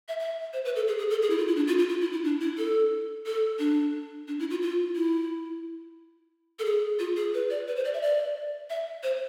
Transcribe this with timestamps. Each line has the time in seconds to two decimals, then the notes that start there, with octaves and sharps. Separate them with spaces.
0.08 E5
0.19 E5
0.53 C5
0.65 B4
0.76 A4
0.88 G#4
0.98 G#4
1.10 A4
1.22 G#4
1.30 E4
1.38 F4
1.48 E4
1.56 D4
1.67 F4
1.79 F4
1.89 F4
2.01 E4
2.12 E4
2.24 D4
2.41 E4
2.58 A4
3.26 A4
3.59 D4
4.28 D4
4.40 E4
4.50 F4
4.62 F4
4.96 E4
6.59 A4
6.65 G#4
6.99 F4
7.16 G#4
7.34 B4
7.50 D5
7.68 B4
7.76 C5
7.84 D5
7.94 E5
8.02 D5
8.70 E5
9.03 C5